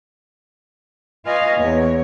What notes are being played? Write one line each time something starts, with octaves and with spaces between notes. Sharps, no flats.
F4 B4 D#5 F5 G#5 C#6
E2 C#5